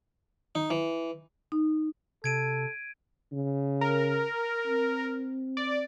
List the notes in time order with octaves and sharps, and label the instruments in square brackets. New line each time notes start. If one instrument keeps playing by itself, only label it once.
[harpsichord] D#4
E3
[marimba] D#4
[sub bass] C3 [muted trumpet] A4 [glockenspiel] G#6 D7 D#7
[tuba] C#3
[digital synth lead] A#4
[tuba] C4
[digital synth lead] D5